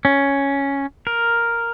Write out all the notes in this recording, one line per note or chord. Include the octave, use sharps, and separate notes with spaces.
C#4
A#4